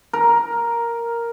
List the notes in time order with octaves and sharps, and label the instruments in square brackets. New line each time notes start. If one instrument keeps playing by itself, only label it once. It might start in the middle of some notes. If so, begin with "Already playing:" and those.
[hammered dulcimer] A#4